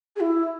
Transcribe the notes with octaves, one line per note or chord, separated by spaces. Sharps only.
G#4
E4